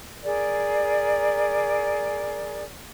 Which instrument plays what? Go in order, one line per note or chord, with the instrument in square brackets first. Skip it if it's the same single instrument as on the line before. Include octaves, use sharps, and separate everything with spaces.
[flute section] G#4 A#4 D5